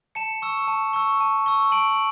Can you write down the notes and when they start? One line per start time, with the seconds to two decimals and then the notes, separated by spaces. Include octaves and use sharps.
0.15 A5 C#7 E7
0.42 C#6 E6
0.68 A5
0.93 C#6 E6
1.20 A5
1.46 C#6 E6
1.71 A5 D7 F#7